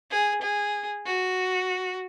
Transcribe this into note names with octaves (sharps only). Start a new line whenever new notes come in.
G#4
G#4
F#4